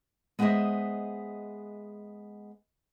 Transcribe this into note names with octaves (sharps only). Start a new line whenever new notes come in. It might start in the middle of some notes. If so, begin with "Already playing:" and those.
G#3 B3 G#4 C5 D#5 E5